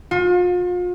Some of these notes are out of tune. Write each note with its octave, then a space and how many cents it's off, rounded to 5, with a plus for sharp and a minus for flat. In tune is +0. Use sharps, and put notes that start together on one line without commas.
F4 +40